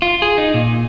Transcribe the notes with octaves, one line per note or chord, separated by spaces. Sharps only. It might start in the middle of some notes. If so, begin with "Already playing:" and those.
F4
G#4
D#4
A#2